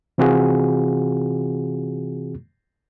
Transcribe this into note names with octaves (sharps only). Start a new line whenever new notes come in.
C3 E3 C4 F4 F#4 G#4